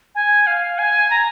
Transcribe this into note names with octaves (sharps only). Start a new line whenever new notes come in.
G#5
F5
G#5
A#5